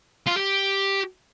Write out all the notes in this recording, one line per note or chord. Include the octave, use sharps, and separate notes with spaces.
F4
G4